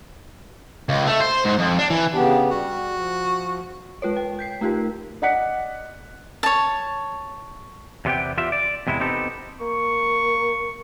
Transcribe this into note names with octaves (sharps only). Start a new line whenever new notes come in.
C#2
A3
C5
G#2
F2
D4
E3
C#3 B3 D4 G4
G3 F#4
F3
G#3 F4 B4 C#5
G5
G6 B6 C7
A3 D#4 F4 G4 A#4
D5 D#5 F#5 F#6 B6 C#7
C#5 A5
E2 C3 B3 G4 G5
E2 F4 G4 E5
D5
E2 C3 G#3 E4
B3 C4 D#4 G4 A4
A#3 C#6